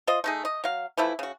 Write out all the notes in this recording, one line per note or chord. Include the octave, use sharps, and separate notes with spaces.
F4 C5 D#5
A3 D#4 G#4
D#5
F#3 F5
E3 F3 A3 E4
C#3 F#4